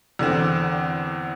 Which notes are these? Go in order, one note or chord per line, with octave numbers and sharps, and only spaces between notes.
E2 D3 C4